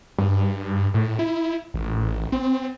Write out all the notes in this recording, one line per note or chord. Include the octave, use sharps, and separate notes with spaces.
G2
A2
E4
A1
C4